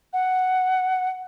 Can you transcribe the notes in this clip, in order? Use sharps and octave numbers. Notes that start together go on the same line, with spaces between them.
F#5